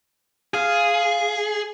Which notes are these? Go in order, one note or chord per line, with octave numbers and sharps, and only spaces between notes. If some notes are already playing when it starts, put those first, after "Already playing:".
F4 G#4 F5